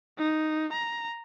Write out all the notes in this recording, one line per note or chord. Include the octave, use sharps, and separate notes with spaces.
D#4
A#5